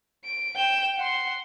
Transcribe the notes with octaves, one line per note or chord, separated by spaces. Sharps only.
D7
G5 E7
F#5 C6